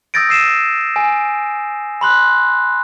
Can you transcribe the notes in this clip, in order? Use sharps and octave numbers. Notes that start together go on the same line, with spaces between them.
D#6 E6 G6 A6 A#6 D7
D#6 E6 C7 D#7 E7
G#5
B5 C6 F#6